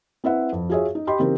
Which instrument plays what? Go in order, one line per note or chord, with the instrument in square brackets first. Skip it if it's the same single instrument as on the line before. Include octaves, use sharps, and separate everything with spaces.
[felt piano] C4 E4 B4 E5 F#5
F2
F4 F#4 G#4 C#5 E5
D#4
G4 D#5 G5 B5 C6
C#3 E3 C4 D#4 G4 A#4